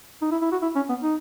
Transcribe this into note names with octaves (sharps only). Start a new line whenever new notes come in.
D#4
E4
E4
F#4
E4
C#4
B3
D#4